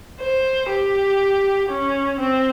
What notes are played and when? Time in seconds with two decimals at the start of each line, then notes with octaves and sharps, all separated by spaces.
0.20 C5
0.70 G4
1.70 C#4
2.20 C4